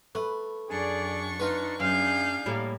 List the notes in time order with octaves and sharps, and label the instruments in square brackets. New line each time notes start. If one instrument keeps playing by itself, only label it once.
[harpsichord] A3 [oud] B4
[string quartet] F#2 D4 C#6 [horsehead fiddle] G#4 D5
[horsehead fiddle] D#4 [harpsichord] F4 B4
[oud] F#2 [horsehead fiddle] D4 F5 [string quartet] G#4 G6
[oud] A2 G3 A#3